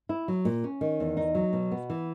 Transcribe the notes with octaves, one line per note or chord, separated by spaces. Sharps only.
E4
F#3
A#2
C#4
D#3
E2
D#4
F#3
B2
B3
E3